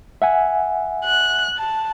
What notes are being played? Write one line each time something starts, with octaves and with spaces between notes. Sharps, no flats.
E5 F#5 G#5
F#6
A5